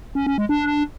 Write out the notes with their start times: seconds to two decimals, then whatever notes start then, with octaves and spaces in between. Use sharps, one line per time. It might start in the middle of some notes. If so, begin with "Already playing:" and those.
0.15 C#4
0.26 C#4
0.38 G#3
0.49 D4